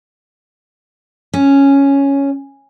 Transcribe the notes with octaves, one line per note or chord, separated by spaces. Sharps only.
C#4